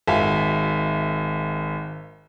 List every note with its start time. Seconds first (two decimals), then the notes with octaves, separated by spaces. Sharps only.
0.08 G#1 F#4 E5 F5 G#5